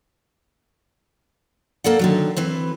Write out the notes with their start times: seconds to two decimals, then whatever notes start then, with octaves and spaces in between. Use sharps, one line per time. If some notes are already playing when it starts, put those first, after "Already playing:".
1.84 A#3 A4 D5 F#5
1.99 D3 D#3 F#3
2.36 E3 C4 B4